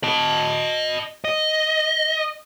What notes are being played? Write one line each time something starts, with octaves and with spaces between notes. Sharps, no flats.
D#5 A5
D#5